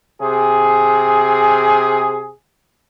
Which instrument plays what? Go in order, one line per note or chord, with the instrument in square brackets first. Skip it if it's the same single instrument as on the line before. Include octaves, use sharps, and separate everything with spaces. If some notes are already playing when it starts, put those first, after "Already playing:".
[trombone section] C3 G#4